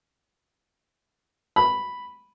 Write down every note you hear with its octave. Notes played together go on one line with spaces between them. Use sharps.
B5